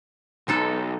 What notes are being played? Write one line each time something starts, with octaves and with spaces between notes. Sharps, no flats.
B1 G#3 D#4 A4